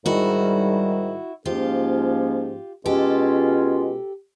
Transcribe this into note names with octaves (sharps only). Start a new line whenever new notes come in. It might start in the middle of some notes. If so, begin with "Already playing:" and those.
G#2 D#3 G3 E4 F#4
G#2 F3 A#3 C#4 F4 G4
B2 G#3 C#4 F4 G4 A4